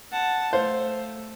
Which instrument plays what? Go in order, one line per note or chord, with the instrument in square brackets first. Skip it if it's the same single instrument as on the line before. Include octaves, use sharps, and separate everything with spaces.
[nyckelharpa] F#5 A5
[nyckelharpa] A3 [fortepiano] C5 F5